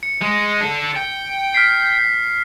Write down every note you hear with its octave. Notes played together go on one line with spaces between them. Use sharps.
C#7
G#3
D4 A4
G5
F6 B6 C7